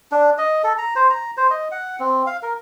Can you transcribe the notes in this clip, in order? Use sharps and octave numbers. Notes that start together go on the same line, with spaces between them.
D4
D#5
A4
A#5
C5
A#5
C5
D#5
F#5
C4
F5
A#4